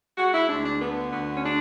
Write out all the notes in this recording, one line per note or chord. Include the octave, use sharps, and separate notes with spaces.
G#3 F#4
E4
D2 D4
D4
D3 B3
D2 B3
C#4
G#3 D4